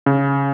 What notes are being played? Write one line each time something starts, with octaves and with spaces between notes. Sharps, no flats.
C#3